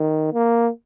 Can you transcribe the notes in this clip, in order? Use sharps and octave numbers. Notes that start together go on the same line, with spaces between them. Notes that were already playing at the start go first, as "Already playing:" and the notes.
Already playing: D#3
A#3